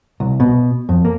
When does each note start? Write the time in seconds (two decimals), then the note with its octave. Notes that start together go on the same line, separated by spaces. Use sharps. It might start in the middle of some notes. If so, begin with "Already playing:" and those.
0.20 C2
0.40 B2
0.89 F2
1.05 A#3